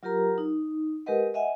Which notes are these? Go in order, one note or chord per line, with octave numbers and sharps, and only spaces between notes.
F#3 F4 G4 A#4 A#5
D#4
G#3 G4 A#4 B4 D#5 F#5
D#5 E5 F#5 G#5